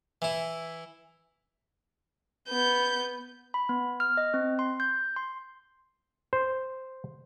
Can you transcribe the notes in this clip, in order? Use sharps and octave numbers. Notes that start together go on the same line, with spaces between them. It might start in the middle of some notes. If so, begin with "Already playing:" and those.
E3 E4
B3 G6
B5
B3
F6
D#5
C4
C6
G6
C6
C5